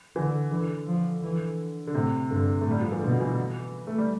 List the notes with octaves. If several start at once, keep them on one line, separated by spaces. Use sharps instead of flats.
D3 E3
D3 E3
F3
E3
D3
A2 C3
G2 D3
A3
A2 G3
F3
E3
B2 D3
E3
A3
G3